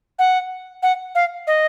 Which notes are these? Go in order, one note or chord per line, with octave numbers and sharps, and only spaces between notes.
F#5
F#5
F5
D#5